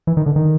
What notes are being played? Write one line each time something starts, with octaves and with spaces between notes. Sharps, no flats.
E3
D#3
D3
D#3